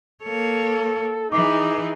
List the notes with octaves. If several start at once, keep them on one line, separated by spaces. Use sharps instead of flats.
A#3 A4 C#5
E3 D#4 G#4 D6